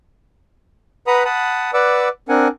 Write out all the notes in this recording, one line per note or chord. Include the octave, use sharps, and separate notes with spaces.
B4 F#5 A#5 B5 D#6
F#5 A5 B5 D#6
B4 D5 F#5 D6 E6
C4 D4 A#4 F#5 G#5